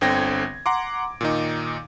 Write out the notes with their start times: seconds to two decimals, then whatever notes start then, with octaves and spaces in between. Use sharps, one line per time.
0.01 G1 D3 C4 G5 G#6 A#6
0.66 F#5 A#5 C6 D6
1.21 A#2 D#3 D#4